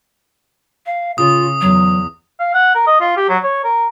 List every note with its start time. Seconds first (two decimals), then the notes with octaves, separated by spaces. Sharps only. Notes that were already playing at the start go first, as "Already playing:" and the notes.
0.86 F5
1.18 C#3 F4 D#6
1.61 E2 F#3
2.39 F5
2.54 F#5
2.75 A#4
2.87 D#5
3.00 F4
3.16 G4
3.29 F#3
3.43 C#5
3.64 A#4